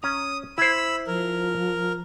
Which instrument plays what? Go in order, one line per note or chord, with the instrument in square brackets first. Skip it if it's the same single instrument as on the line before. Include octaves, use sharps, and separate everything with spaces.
[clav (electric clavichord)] C#4 A#5 [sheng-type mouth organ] D#6
[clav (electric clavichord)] E4 C5 [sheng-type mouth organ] B5 E6
[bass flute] F3 [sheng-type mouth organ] A#4